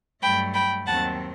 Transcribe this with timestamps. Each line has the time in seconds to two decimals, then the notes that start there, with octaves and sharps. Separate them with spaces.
0.22 G2 F#3 A3 G5 B5
0.53 G5 B5
0.86 D#2 D#3 F#3 C4 F#5 A5